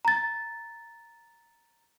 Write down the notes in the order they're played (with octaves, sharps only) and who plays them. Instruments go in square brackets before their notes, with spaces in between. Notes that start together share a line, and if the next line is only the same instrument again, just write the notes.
[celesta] A#5 A6